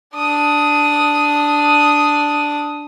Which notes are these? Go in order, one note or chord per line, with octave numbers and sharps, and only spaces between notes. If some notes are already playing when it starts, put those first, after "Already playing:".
D4 D#6